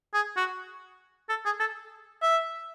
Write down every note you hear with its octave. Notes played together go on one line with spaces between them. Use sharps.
G#4
F#4
A4
G#4
A4
E5